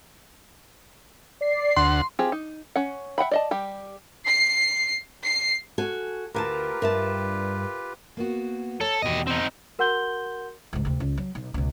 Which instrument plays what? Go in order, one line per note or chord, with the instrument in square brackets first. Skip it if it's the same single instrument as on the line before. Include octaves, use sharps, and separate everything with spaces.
[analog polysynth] D5 C7
[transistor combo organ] D2 F#5 [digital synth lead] C6
[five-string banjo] C4 F4 G4 G#4
D#4
C#4 F#5
E5 F#5 G5 B5
D5 D#5 A5
G3 G4
[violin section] C7
C7
[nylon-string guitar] F#4 A4 G#5
[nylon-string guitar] D2 G#5 A5 [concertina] F4 G4 B4 [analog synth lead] A#4
[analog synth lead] G2 [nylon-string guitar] A#4 E5 A5
[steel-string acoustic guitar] A#3 B3 F#4
[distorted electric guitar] A4 [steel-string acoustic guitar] C#5 A#5
[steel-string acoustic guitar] E2 B2 D#3 [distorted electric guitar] G4 D#5
[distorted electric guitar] C4 D#4
[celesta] F#4 A#4 F#5 C6 G6 G7
[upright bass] C#2 G#2
D2 C3
C#2
F#3
B1
C#2 B2